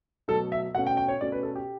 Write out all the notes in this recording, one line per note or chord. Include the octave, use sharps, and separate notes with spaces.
B2 F#3 A3 A4
E5
B2 A3 C#4 F#5
G5
G5
C#5
B2 A3 C#4 D5
B4
A4
G4